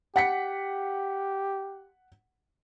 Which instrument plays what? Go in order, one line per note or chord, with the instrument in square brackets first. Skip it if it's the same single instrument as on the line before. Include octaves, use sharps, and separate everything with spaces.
[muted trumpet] G4 [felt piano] F#5 B6 C#7